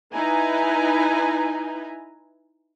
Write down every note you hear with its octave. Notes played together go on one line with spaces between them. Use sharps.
D#4 E4 B4 G#5 A#5